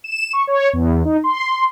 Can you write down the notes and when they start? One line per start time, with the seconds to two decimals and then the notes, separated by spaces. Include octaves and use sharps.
0.04 E7
0.33 C#6
0.47 C#5
0.73 E2
1.05 D#4
1.24 C6